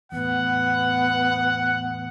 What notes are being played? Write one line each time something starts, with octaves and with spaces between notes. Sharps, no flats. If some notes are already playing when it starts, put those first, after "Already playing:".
E2 A2 B3 F#5